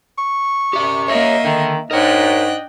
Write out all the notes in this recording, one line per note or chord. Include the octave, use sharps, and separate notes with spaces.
C#6
F#2 G4 D5 E5
A#3 A#4 C#5 D#5 E5
D3 D#3
G#2 D4 A#4 C#5 D#5 G5 F#6